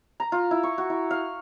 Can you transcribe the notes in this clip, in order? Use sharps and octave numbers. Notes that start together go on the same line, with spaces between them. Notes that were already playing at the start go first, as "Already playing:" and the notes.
A#5
F4
E4
C#6
F#4
E4
F5